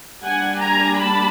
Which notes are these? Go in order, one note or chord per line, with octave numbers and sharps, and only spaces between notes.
G3 A#3 D4 F#5 G#5
G#5 A#5
A5 B5